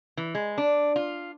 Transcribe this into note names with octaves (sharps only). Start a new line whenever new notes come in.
E3
G#3
D4
F4